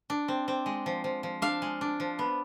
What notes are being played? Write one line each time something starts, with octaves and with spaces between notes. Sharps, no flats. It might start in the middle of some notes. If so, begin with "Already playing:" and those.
D4
C4
C4
G#3
F3
F3
F3
D4 F5
G#3
D4
F3
B3